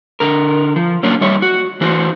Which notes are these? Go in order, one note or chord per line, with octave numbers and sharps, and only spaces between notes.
D3 A#4
F3
F#3 A#3 C#4 D4 F4
G3 D#4 C#5 E5
F#4
E3 D#4 F#4 C5